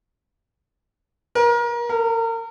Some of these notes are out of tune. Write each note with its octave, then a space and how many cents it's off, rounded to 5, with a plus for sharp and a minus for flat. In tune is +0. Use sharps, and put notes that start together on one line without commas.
A#4 +30
A#4 -35